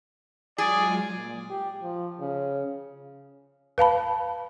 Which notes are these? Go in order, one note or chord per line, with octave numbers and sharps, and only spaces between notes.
F#3 G#3 F4 G#4 D5 G#5
A#2
G4
F3
C#3
B4 F5 A5 B5